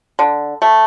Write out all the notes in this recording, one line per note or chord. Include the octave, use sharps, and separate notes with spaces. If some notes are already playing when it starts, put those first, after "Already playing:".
D3
A3